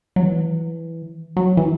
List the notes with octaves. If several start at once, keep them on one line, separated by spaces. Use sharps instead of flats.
F#3
E3
F#3
E3